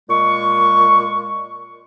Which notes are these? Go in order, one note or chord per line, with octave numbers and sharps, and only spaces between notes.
A#2 G#3 C#6